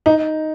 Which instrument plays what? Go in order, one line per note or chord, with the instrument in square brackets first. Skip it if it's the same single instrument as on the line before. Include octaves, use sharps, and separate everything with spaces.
[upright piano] D#4